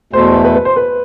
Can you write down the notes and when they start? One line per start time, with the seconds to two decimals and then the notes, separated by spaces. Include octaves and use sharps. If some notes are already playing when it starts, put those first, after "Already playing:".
0.13 E2 B2 A3 C5
0.44 B4
0.55 B4
0.65 C5
0.76 B4